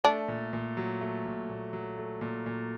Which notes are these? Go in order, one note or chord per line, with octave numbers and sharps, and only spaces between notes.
A3 D4
A#2
A#2
F#3
A3
A#2
A#2
F#3
A3
A#2
A#2